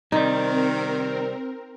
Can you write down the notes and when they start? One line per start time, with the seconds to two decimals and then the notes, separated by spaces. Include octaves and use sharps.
0.12 C3 D#3 G3 C4 D#4 A#4